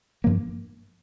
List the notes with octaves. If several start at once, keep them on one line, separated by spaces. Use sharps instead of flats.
G2 F3 A#3 D4